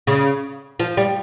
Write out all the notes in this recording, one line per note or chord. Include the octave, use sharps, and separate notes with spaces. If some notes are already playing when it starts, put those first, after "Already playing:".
C#3
F3
G3